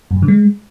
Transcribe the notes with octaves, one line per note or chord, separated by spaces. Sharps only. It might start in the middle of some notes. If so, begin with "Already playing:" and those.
F#2
G#2
D3
G#3